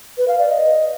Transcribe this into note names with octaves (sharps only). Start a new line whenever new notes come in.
B4
F5
D5
D#5